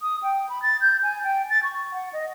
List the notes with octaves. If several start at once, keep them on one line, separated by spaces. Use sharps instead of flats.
D#6
G5
B5
A6
G6
G#5
G5
A6
C#6
F#5
D#5